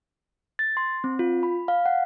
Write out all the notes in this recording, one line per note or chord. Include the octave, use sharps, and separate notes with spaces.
A6
C6
C4
F4
B5
F5
F#5